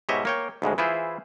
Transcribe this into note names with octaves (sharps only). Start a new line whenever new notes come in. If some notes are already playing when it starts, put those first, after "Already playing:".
G#2 B2 G4 C#5 D#5 E5
A#3 C#5 G5
D2 G#2 C#3 G#3
E3 E4 F4 G#4 C5